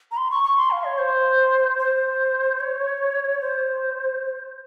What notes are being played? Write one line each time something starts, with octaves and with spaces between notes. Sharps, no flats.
A#5
C6
C#6
C#6
C6
F5
C#5
C5
C5
C#5
C5